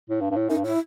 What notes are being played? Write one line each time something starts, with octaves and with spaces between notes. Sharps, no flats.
A2
G2
G2
A2
F#2 D#4
G2
A2 E4